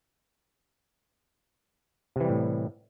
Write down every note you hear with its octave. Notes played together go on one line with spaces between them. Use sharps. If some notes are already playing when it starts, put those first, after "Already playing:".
A2 C3 E3 G3